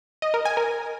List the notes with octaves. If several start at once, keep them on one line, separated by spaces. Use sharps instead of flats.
D#5
A#4
G#5
A#4